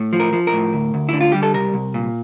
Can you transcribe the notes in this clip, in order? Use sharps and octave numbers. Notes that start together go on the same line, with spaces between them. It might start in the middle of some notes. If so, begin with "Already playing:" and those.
Already playing: A2
F3
A#4
F3
A#4
A2
D2
D2
D3 E4
F4
G3 G4
A4
C2 A#4
C2
A#2